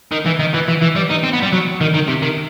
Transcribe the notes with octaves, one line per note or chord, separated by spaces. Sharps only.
D#3
E3
D#3
E3
E3
E3
G3
D#4
C4
B3
G3
F#3
D#3
D#3
C3
D#3